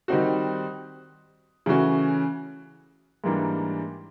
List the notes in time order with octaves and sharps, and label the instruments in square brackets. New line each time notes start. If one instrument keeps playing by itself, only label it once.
[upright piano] D#3 G3 C4 D#4 F#4
C#3 E3 A3 C#4 F#4
G#2 E3 G3 A#3 D4